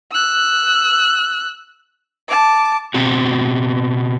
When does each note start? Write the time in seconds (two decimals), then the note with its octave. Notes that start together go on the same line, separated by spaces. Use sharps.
0.12 E6 F#6
2.29 A5 D6
2.94 B2 C4 F#4